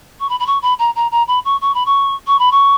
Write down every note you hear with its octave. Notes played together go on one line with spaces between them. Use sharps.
C#6
B5
B5
C#6
B5
A#5
A#5
A#5
B5
C#6
C#6
B5
C#6
C#6
B5
C#6